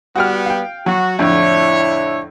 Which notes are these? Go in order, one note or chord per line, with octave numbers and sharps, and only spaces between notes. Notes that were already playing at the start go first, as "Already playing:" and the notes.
G3 B3 F#4 G5 F6
F5 G5
F#3 F#4
F2 A2 D3 D4 E4 C#5